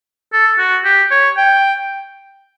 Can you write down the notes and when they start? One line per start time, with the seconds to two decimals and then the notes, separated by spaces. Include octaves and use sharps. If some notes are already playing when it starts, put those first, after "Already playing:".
0.33 A4
0.58 F#4
0.84 G4
1.11 C#5
1.37 G5